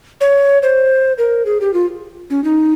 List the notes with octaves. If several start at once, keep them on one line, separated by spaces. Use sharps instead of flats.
C#5
C5
A#4
G#4
G4
F4
C#4
D#4